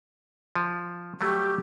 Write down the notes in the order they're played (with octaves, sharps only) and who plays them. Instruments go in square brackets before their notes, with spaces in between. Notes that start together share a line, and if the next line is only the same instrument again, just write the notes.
[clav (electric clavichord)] F3
[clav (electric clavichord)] F#3 G3 A3 [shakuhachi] G4